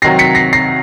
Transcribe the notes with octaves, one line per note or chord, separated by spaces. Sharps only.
C3 D#3 F#3 A#6 C7
B6 C#7
A#6 C7
A#6 C7